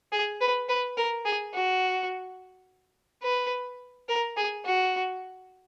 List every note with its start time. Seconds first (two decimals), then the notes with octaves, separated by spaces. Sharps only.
0.12 G#4
0.41 B4
0.69 B4
0.97 A#4
1.25 G#4
1.54 F#4
3.23 B4
4.09 A#4
4.37 G#4
4.65 F#4